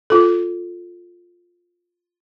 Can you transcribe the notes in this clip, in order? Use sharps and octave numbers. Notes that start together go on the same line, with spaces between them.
F4 A4